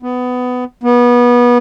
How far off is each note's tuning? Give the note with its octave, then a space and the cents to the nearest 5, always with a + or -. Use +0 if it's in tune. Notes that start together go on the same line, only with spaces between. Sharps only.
B3 +15
B3 -25